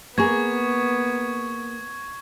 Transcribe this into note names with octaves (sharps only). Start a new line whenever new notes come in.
A#3 B3 G#4 C#6 G#6